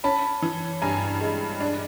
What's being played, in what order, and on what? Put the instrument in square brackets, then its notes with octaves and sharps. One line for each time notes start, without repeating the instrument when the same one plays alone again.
[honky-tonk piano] C#4 [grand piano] A5 B5
[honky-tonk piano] E3
[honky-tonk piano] G2 [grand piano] G#5 A#5
[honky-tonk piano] G#3
D4